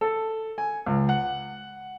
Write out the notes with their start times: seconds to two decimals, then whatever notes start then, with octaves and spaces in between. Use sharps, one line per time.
0.01 A4
0.58 G#5
0.86 C#2
1.09 F#5